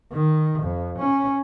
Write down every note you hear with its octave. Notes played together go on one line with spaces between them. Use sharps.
D#3
F2
C#4